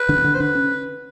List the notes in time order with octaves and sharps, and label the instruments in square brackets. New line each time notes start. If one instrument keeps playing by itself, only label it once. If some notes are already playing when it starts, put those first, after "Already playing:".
Already playing: [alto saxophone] B4
[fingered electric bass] D3 D4
C#4
D3 D4
[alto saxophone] C5
[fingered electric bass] D3 D4 [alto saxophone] B4
[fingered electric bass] C#4